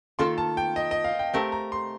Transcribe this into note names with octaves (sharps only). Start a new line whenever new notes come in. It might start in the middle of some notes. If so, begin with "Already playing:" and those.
D#3 A#3 F4 A4 C6
A5
G5
D#5
D#5
F5
G5
A3 C4 G4 A#4 A5
A#5
C6